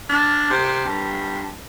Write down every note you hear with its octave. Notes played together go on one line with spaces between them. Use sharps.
D4
C3
G2